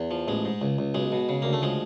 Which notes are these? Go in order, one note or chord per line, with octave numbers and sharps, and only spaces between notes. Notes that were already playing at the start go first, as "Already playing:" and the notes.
Already playing: E2
F3
A1 G#3
G#2
C#2
C#2
B1 G#3
B2
C#3
D2 A#3
A3
F3 G#3